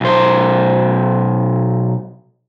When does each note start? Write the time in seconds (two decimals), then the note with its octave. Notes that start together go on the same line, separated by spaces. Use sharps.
0.01 B1 C5